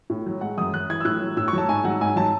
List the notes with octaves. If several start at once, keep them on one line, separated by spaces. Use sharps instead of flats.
A2
F#3
G#3 F#5
F#2 D#6
F#2 F#6
E3 G#6
E6
A2 F#6
F#3
A2 E6
C#6
F#3 A5
G#2 G#5
F#3 F#5
G#2 G#5
F#3 A5